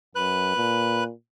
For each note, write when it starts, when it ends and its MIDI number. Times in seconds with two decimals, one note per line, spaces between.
0.15 0.52 42
0.15 1.04 71
0.15 1.04 90
0.57 1.12 46